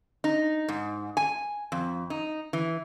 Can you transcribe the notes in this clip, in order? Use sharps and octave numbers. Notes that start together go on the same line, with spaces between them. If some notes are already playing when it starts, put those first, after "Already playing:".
D#4
G#2
G#5
F2
D#4
E3